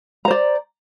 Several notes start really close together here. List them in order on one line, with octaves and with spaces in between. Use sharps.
A#5 C5 D5